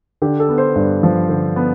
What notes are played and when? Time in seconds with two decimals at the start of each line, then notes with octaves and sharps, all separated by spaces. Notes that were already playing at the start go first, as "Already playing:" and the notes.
0.22 D3 G4
0.40 A4
0.49 B3
0.58 C5
0.76 G2
1.03 F3
1.29 D3
1.56 B3